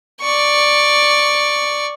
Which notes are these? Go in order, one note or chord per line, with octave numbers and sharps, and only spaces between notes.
D5 C#6